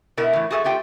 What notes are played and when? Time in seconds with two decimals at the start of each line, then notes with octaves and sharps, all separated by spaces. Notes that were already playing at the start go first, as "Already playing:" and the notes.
0.17 B2 E4 A#4 E5
0.33 A2 E3
0.51 F#4 G#4 A4 C5 E5
0.64 A3 F4 G4 G5